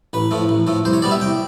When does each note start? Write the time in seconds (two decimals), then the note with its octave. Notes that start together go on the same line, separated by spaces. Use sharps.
0.13 A1 B4
0.31 A2 F3 A3
0.49 A1
0.67 A2 F3 A3
0.85 C2 C5
0.93 C#5
1.02 B2 G3 B3 D5
1.11 E5
1.20 C2 G5